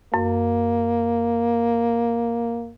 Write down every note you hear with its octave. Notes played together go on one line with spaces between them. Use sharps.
F#2 A#3